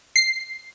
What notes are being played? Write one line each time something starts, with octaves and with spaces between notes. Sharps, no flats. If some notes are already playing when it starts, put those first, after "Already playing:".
C7